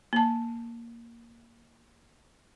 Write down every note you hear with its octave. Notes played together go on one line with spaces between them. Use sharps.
A#3 A5